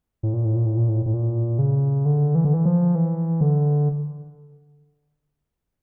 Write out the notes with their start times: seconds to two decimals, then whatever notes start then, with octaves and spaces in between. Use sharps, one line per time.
0.23 A2
0.33 A#2
0.45 A2
0.56 A#2
0.66 A2
0.77 A#2
0.89 A2
1.06 A2
1.14 A#2
1.59 C#3
2.05 D3
2.35 E3
2.45 D3
2.54 E3
2.65 F3
2.95 E3
3.41 D3